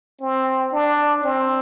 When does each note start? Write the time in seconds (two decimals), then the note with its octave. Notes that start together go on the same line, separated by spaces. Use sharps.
0.21 C4
0.72 D4
1.24 C4